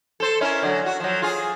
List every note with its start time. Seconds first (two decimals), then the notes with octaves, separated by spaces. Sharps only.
0.20 A4 C5
0.41 C#4 E4 A#4
0.63 D3 F#3
0.86 F#4
1.00 F3 F#3
1.22 F4 G#4